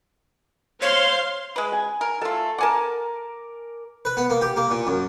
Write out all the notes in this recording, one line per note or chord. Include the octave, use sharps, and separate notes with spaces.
C5 C#5 F5 C6
G#3 B4
G#5
A#4
A3 F4 A4 A5
A#4 F#5 G#5 A5 D6
B4
B3
A#3
G4
A#3
A#2
F#2